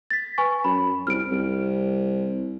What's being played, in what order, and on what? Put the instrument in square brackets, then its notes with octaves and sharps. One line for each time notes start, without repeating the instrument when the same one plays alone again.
[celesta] A6 B6
B4 G#5 C#6
[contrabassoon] F#2 [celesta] B5
[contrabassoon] C2 [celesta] F6 D7
[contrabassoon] C2